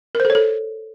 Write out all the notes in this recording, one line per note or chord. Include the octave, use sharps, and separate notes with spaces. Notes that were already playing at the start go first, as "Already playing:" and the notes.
A#4
C5
A4
C#5
A4